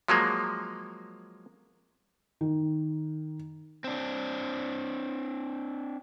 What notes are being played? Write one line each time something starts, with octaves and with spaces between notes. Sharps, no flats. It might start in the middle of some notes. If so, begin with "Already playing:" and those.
F3 F#3 G#3 A#3
D#3
C4 D4